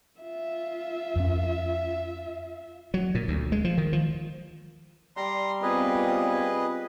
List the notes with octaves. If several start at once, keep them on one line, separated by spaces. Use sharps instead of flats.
F4 E5
F2 C#4
F#3
A#2
D2
G#3
F3
D#3
F3
G3 A#5 C6
B3 C4 F4 G#4 B4 D#5